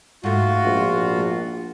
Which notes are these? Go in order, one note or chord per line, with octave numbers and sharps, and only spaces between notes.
G#2 A3 F4 F#4
A#1